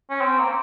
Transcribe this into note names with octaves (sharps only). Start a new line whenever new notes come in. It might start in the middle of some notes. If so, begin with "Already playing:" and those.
C#4
C4
A#3